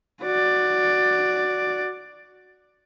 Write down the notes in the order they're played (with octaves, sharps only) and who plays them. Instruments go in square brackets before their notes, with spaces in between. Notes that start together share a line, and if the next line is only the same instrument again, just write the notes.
[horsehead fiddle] F#4 D5